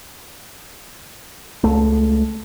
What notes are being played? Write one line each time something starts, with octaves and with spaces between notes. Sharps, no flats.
C#2 A3